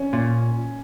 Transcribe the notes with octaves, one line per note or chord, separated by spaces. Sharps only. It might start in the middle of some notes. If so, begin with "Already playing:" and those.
Already playing: C#4
A#2